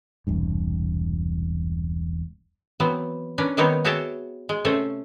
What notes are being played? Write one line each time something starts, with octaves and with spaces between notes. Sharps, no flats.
E1 C2 G2
E3 F#3 B3 C4
C#4 D4 A#4 B4
D#3 G3 B3 C4 D#4 C#5
F#4 G#4 C#5 E5 G5 A5
G#3
C3 A3 C#4 A4 C5